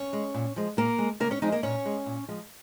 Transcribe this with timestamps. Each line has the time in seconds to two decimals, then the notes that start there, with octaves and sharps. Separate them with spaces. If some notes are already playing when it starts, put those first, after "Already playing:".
Already playing: C#4 C#5
0.13 G#3
0.34 A#2
0.56 F3 G#3
0.77 A#2 A#3 A#4
0.98 G#3
1.20 C#3 A#3 A#4
1.31 C#4 C#5
1.42 F3 G#3 D#4 D#5
1.52 A#3 A#4
1.63 A#2 C#4 C#5
1.85 G#3
2.06 A#2
2.28 F3 G#3